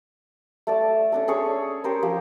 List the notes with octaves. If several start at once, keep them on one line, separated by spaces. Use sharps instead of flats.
A3 D5 A5
C#4 D4 A4
C#4 G#4 A4 C#5
C#4 G4 A#4 C5
F3 G4 C5